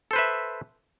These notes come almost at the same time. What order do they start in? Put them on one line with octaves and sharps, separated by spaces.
A4 C5 B4 E5